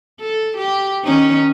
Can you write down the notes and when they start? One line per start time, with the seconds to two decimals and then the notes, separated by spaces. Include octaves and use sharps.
0.20 A4
0.57 G4
1.04 D#3 C#4 D#4